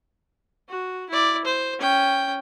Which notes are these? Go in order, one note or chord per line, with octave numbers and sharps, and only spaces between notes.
F#4
E4 D5
C5
C#4 G5